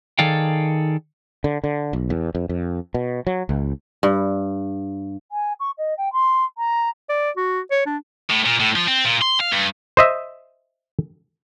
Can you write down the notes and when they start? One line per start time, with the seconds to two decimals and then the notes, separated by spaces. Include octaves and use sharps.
0.19 D#3 G#4 A4 D5 F5 G5
1.44 D3
1.64 D3
1.93 B1
2.10 E2
2.35 F2
2.49 F2
2.94 B2
3.27 F#3
3.49 C#2
4.03 G2
5.30 G#5
5.60 C#6
5.78 D#5
5.98 G5
6.13 C6
6.58 A#5
7.09 D5
7.37 F#4
7.71 C#5
7.86 D4
8.30 A2
8.46 A#2
8.60 A2
8.76 F3
8.88 C4
9.05 A#2
9.22 C6
9.40 F5
9.52 G2
9.97 C5 D#5 E5